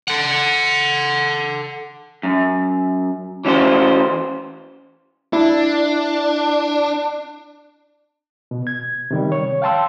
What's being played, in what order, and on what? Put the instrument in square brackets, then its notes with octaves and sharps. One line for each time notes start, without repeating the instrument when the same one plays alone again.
[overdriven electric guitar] A4 F#5
[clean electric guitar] F#2
E3 C#4 F#4 C5
[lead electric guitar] D4 [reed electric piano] E4
[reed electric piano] B2
G#6
C3 D#3 G3
C#5
F5 G5 A5 C6 E6